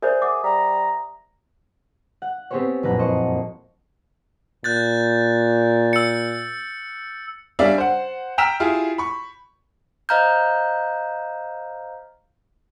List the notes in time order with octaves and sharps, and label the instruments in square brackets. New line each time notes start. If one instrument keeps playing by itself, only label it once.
[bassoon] G#4 [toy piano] A#4 C5 [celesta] D5 E5 G6
[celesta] E5 F#5 D#6 [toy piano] D6
[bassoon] G3 [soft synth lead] A#5
[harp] F#5
B3 C4 G4 G#4 C5 C#5
F#1 F2 A#2 B4 F#5 A#5
C5 D#5 C6 C#6
[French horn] A#2 [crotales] F#6 G6 A6
[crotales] E6 C#7
[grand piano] G3 C#4 D4 D5 E5 F5
C5 F#5
G5 A#5 E6 F6 B6 E7
E4 F4 G4 G#4
B5 C#6
[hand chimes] C5 D#5 F5 A#5 F6 G6